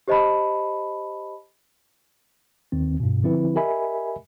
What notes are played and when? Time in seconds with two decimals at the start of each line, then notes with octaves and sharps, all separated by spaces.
0.08 G4 C5 D#5 A5 B5
2.72 D#2 D#3 C4
3.00 G2 B2
3.23 D3 F3 C4 E4 B4
3.56 G4 A#4 D#5 E5 G#5 B5